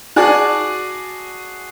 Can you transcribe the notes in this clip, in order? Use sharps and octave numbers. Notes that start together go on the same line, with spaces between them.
F#4 G#4 D5 G#5 A5